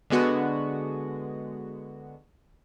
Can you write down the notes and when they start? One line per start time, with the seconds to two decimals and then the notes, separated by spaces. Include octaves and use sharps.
0.10 D3 G#3 B3 F#4